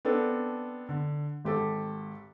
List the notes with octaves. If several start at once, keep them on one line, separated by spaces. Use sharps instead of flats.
B3 C4 D4 A4
D3
G#1 G4 A4